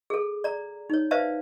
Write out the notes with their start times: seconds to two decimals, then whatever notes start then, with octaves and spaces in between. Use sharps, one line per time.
0.10 G#4 A4
0.44 D5 A#5
0.90 D#4 C#5
1.11 B4 C5 D5 E5 F5 A5